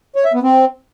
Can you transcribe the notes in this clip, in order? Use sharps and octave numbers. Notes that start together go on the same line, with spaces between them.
C#5
E5
B3
C4